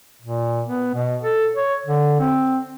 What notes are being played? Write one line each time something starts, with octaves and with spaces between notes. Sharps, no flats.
A#2
B3
B2
A4
C#5
D3
C4